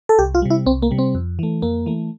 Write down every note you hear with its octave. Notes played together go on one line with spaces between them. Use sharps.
A4
C2 G4
F4
C3 G3
E4
C2 C4
A#3
C3 G3
C4
F2
E3 A3
F2 A#3
E3 A3